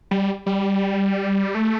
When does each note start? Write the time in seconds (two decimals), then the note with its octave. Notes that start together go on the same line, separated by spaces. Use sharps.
0.11 G3
0.46 G3
1.55 A3